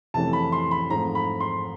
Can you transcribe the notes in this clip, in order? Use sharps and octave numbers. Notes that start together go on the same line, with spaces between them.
F2 C3 E3 A3 C#4 A5
B5
C6
B5
G#2 F3 A3 C4 A#5
B5
C6